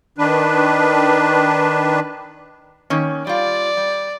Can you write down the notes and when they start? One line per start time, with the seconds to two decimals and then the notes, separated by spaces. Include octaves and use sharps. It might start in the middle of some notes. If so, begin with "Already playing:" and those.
0.18 D#3 D4 B4
2.90 D#3 A#3 C#4
3.27 G3 F4 D5
3.77 G3